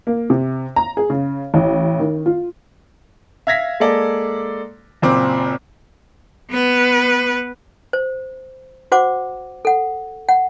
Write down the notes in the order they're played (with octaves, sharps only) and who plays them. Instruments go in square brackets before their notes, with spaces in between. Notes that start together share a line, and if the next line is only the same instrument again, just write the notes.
[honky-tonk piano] A#3
C3
A#5
G#4
C#3
A1
D#3
F4
[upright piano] E5 F5 G#6 A#6 B6
G#3 A#3 A4 D5
F#1 A#2 C4 D6
[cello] B3 B4
[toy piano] C5
F#4 C5 F#5 D6
A4 F#5
F#5